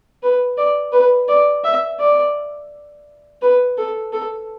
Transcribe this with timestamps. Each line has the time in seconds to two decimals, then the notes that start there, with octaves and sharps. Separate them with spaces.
0.23 B4
0.58 D5
0.93 B4
1.29 D5
1.65 E5
2.00 D5
3.42 B4
3.78 A4
4.13 A4